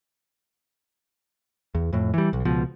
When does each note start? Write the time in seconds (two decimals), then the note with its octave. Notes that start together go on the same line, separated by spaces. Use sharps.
1.75 E2
1.93 F2 A2
2.14 E3 G3
2.33 B1
2.45 C#2 B2 F3